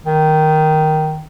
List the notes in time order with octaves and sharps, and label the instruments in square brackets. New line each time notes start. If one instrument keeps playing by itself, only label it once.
[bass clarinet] D#3